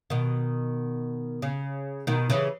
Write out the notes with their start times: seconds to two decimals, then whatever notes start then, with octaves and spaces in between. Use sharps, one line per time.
0.10 B2 D#3
1.42 C#3
2.07 B2 D#3
2.30 C#3 E3